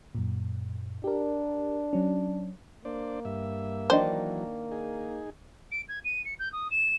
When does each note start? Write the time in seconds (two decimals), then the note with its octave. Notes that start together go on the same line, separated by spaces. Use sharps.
0.15 F#2 A#2
1.04 D4 G4 A#4
1.93 F#3 C#4
2.85 A#3 D4 C5 D5
3.25 G2 E5
3.90 D#3 E3 F#3 D4 C5 D#5
4.71 D#4 G#4
5.71 D7
5.88 G#6
6.04 D#7
6.25 C#7
6.39 G6
6.52 D#6
6.70 E7